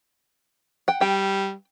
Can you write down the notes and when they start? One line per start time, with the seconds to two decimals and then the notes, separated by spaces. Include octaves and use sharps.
0.88 F#5 G5
1.01 G3 G5